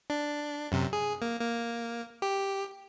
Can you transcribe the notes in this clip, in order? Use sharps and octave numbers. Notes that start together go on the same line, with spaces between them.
D4
F#2 C3
G#4
A#3
A#3
G4